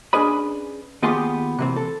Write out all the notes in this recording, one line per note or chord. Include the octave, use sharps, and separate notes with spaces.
C#4 D4 G#4 B4 D#5 B5
D#2 B3 F4 G4 G#4 C6
C3 E3 C4
A4